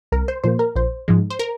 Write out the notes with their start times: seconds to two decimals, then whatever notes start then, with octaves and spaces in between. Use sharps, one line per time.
0.12 C2 A#4
0.28 C5
0.44 A#2 F3 A#3 C5
0.59 A#4
0.75 A#1 C5
1.08 G#2 F3 G#3
1.30 C5
1.39 A#4